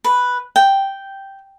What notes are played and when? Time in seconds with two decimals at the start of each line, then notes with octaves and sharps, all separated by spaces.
0.04 B4
0.56 G5